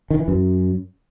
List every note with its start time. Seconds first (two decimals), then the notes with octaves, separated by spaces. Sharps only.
0.10 D#3
0.19 E3
0.28 F#2